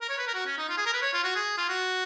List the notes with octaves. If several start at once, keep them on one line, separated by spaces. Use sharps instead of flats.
A#4
C#5
B4
A#4
F#4
C#4
D#4
F4
G#4
A#4
B4
C#5
F4
F#4
G#4
F4
F#4